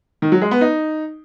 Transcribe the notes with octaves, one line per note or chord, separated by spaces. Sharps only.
D#3
F#3
G#3
B3
D#4